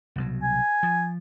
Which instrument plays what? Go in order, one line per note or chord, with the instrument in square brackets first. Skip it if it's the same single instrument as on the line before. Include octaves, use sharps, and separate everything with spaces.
[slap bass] C2 B2 F#3
[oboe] G#5
[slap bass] F3